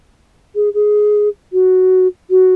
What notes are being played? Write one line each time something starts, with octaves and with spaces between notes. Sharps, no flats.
G#4
G#4
F#4
F#4